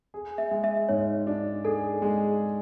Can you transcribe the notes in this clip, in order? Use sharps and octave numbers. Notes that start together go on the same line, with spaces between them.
G#4
E5
G#3
E5
G#2 C#5
D4
G#4 A4
G#3